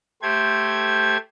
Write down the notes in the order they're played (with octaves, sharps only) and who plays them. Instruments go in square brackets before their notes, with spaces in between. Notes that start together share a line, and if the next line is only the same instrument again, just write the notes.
[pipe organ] A3 G4 C5 G#6